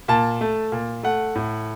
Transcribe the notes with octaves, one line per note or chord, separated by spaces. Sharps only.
A#2 A5
A3
A#2
A3 F#5
A2